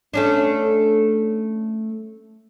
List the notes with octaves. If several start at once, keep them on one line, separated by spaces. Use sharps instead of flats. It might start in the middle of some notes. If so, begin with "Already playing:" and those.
A3 C#4 D4